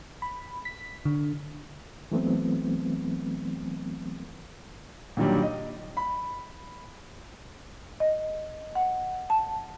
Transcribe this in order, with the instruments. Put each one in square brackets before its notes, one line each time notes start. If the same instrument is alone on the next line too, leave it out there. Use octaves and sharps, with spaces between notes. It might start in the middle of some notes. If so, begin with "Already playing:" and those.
[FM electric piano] B5
B6
D3
[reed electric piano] E3 F#3 A3 B3 C4
[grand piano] A#2 D3 D#3 F#3 G3
D#5
B5
[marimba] D#5
F#5
A5